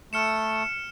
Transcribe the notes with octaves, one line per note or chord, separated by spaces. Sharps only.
A3 F6 C#7 E7